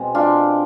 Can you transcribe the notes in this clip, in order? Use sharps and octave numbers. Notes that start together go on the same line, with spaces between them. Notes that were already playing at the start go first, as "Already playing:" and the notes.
Already playing: B2 G#3 C4
D4 F4